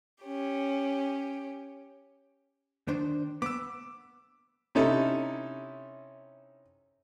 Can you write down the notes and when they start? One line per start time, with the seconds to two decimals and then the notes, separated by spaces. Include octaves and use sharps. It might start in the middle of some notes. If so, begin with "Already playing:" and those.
0.23 C#4 G4
2.88 D#3 D4 C5
3.42 B3 D6 E6
4.75 C3 C#4 D#4 E4 A4